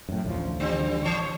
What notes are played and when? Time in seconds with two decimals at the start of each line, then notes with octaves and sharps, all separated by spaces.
0.09 F#2 A2
0.24 A1 D2 F3
0.60 D3 G3 C4
1.04 E3 C#5